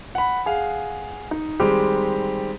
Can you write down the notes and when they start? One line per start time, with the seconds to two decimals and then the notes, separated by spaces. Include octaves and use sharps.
0.15 F#5 B5
0.46 G#4 F5 F#5
1.31 D#4
1.60 D#3 G3 G#3 C4 G4